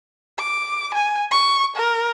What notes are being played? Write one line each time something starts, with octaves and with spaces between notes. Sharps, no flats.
D6
G#5
C#6
A#4